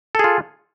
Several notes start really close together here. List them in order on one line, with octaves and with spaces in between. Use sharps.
A4 G#4 F4